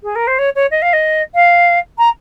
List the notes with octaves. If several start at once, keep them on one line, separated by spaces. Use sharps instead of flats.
G#4
A#4
C5
C#5
C#5
D#5
F5
D#5
F5
A#5